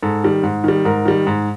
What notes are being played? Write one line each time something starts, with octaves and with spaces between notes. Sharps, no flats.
G#2 A4
D#3 G3
G#2
D#3 G3
G#2 A#4
D#3 G3
G#2